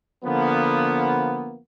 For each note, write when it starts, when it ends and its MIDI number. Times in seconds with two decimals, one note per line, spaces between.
0.25 1.58 50
0.25 1.58 53
0.25 1.58 58
0.25 1.58 59